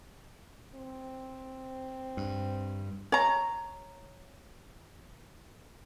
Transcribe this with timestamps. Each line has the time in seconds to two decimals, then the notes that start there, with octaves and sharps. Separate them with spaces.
0.75 C4
2.17 G2
3.12 C#5 A#5